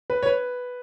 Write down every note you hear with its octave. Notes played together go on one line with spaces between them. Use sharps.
B4
C#5
B4